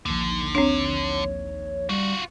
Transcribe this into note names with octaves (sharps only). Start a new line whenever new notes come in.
A#1 D#2 D3
C4 D4 C#5
G3 F4 F#4